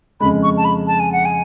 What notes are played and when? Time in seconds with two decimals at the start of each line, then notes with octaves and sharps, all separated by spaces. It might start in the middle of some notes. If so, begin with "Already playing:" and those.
0.21 F2 C#3 G#3 B5
0.43 C#6
0.57 A5
0.65 B5
0.87 A5
1.00 G#5
1.13 F#5
1.26 G#5